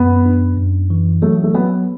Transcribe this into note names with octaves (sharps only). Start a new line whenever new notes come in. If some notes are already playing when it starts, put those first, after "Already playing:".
Already playing: F#2 B3
D4
F#2
E3
F#3 A3
A3
F#3 B3